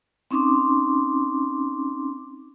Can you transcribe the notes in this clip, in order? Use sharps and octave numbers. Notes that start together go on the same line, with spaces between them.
C4 C#4 D#4 C6 D6